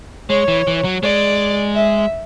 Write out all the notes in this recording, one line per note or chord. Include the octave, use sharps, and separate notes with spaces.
G#3 C#5
E3
E3
F#3
G#3 D5
E5